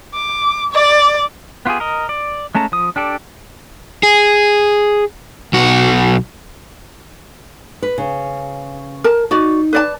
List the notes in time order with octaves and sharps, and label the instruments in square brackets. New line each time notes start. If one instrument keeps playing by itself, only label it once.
[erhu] D6
D5
[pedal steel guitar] B3 F4 G4 G#4
A#4 D#5
D5
G#3 A3 C#4 A5 A#5
F3 D#6
D4 G4 A4 D5
[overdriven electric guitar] G#4
B1 F#4
[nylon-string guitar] B4
C#3
[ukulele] A#4 A5
[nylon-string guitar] D#4 [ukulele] F#4 D5
[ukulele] B4 D5 A5